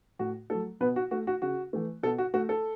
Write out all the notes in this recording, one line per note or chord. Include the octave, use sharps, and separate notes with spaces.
A2 F#4
F#3 A3 A4
B2 B3 B4
F#4
A3 F#4
F#4
C#3 F#4
E3 A3
B2 A4
F#4
A3 F#4
A4